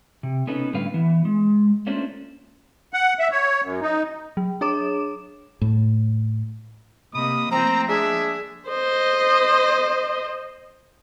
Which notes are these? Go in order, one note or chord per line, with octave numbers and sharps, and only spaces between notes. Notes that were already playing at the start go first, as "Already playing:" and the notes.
C3
B3 C#4 D#4 A4 B4
A2 D3 G3 B4 F5
E3 B3
G#3
A3 A#3 C#4 D4 F4 C5
F#5
E5
C#5
F#2
D#4
F#3
D4 G#4 C#5 D6 E7
A2
C3 A#3 D#5 B5 D#6
F3 A3 A#3 C4 A#5
G#3 D4 G#4 E5
C5 D#5